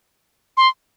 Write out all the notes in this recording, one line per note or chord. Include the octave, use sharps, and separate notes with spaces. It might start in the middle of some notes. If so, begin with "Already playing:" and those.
C6